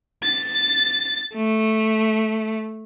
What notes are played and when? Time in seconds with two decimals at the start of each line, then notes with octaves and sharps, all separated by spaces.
0.24 A6
1.35 A3